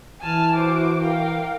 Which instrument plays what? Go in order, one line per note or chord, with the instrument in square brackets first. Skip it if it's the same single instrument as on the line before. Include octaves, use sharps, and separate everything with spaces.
[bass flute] E3 [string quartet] G#5 A5 F6
[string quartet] F#4 C5 D6
A#4 F5 G5